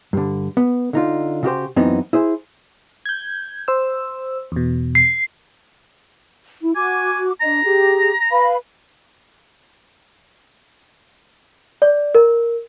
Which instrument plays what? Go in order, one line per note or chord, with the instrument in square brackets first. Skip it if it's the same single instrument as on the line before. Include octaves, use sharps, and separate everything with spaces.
[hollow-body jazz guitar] G2 D3
B3
D3 D#4 F4
C#3 F#4 G4 C5
F#2 E3 B3 C4 D#4
E4 G#4 C5
[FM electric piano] G6 G#6
C5 E6
E2 B2
[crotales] C7
[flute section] E4
[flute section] F#4 D6 [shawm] G#5
[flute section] D4 D#5 [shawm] A#5
[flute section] G4 G#4
B4 F5 B5
[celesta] D5
A#4